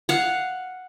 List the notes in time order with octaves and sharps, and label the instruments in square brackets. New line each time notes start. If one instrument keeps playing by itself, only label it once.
[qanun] F5 F#5